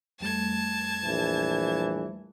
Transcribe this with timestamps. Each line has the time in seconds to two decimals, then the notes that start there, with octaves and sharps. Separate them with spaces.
0.20 F2 G3 A3 A5 G#6
1.04 A#1 E3